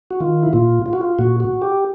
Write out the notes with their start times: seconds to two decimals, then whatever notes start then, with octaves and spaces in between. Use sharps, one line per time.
0.11 F#4
0.20 D#3 F4
0.43 E4
0.53 A#2 F4
0.86 F4
0.93 F#4
1.01 F4
1.19 A#2 F#4
1.40 F#4
1.62 G4